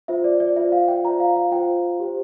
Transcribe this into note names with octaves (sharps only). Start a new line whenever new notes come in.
F4 C5 E5
D5
D5
F4 C5 E5
F5
G5
F4 C5 A#5
F5
F5
F4 C5 G5
G4 C5